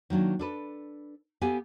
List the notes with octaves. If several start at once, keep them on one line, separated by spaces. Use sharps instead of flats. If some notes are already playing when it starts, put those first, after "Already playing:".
D#3 F#3 A#3 D4
D4 A4 B4
B3 G4 A4 F5 F#5 G#5